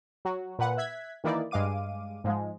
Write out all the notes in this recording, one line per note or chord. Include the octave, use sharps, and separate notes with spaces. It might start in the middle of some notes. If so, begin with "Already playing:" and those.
F#3 F#4
A#2 B4 F#5
E5 F#6 G#6 B6
D#3 E3 A#3 D#4 E4 D5
G2 G#3 F5 D6 D#7
G#2 F3 G#3